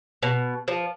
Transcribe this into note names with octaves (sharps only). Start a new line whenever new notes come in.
B2
F3